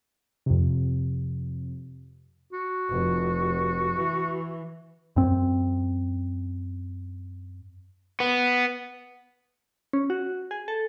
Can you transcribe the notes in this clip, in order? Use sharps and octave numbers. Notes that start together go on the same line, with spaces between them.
F2 C3
F#4
F1
E3
F#2 C4
B3
C#4
F#4
G#4
A4